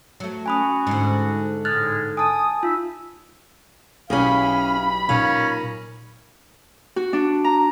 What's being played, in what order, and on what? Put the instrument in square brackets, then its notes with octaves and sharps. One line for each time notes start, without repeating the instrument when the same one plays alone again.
[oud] F#3 A3
[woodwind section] C#4 F#4 [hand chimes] G#5 B5 D#6
[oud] G#2 D3
[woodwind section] A2 G#3 [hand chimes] F6 F#6 A6
[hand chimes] G#5 A5 [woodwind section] D#6
[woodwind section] D#4 E5 [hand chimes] F4
[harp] B1 G4 [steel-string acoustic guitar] C#4 E4 G#4 [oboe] F5 [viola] B5
[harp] A#2 D#4 A#6 [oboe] C#4 [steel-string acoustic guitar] F5
[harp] F#4
D4
A#5